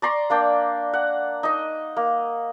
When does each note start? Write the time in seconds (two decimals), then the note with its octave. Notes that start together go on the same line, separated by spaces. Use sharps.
0.02 D5 A#5 C6 C#6
0.30 A#3 D4 G5
0.93 F#5
1.43 D#4 D#5
1.97 A#3